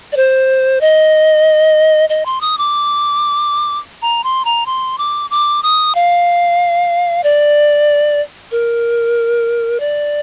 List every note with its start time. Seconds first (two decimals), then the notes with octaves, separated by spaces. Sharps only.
0.12 D5
0.16 C5
0.81 D#5
2.09 D#5
2.26 C6
2.41 D#6
2.58 D6
4.02 A#5
4.24 C6
4.45 A#5
4.66 C6
4.98 D6
5.30 D6
5.63 D#6
5.95 F5
7.24 D5
8.51 A#4
9.80 D5